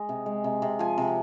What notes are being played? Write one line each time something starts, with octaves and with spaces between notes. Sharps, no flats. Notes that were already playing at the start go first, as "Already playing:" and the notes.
Already playing: G#3 D#5
C3
G#3
C3
C3
F3 G#5
C3